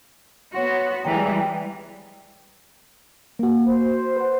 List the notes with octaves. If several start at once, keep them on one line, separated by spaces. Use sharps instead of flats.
B3 F#4 C#5 C6
E3 G3 G#3 D5 G5 A#5
A#3 F#4
C5
B4 F#5